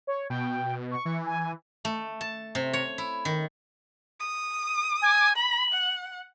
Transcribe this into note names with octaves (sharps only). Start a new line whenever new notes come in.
C#5
B2 G5
C#6
E3
G#5
A3
A5
C3
C#5
E4
D#3
D#6
G#5
B5 F#7
F#5